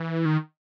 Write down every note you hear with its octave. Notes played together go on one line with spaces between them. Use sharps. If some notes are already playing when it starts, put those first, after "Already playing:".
Already playing: E3
D#3